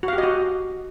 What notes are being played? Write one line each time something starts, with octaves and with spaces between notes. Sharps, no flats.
F#4
F5
G4
D#5
F#4